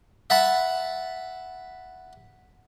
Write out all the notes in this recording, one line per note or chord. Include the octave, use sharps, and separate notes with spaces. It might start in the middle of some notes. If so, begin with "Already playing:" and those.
E5 F#5 A5 B5